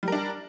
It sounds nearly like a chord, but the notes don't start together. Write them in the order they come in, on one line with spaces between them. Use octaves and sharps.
G3 A#4 D4